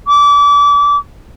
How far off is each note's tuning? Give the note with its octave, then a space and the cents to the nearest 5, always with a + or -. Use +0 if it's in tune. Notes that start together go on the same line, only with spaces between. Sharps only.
D6 -30